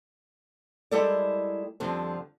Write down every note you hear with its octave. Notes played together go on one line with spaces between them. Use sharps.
G3 G#3 E4 A4 A#4 D5
F2 D3 F3 G3 C4